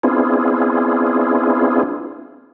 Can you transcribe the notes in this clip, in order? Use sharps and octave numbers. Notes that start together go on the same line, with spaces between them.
B3 C4 D4 E4 F4 G#4